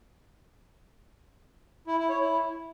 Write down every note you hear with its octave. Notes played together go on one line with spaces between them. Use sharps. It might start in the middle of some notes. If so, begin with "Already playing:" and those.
E4
E4
C#5
E4